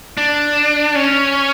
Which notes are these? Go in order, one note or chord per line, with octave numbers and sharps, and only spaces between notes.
D4
C#4